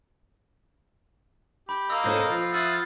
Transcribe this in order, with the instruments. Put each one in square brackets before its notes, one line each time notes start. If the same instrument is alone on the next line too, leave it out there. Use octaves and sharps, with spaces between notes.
[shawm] G4 [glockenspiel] B5
[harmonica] A#3 D#5 A#5 [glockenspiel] E6
[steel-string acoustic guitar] G#2 C#4 A4 [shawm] G#4 [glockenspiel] G6 A#6
[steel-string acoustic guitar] F3 [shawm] F4
[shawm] F4 [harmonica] E5 F#5 D#6 [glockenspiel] A6